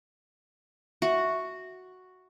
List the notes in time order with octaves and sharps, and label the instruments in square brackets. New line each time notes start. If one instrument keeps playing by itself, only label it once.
[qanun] F#4 [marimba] E5